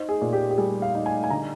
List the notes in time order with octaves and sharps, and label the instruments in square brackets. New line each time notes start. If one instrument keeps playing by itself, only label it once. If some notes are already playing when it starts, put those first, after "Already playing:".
Already playing: [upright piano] D#4 C5
G#4
A#2
G4
G4
G3 G#4
F5
D#4
G#5
G#5
D3 A#5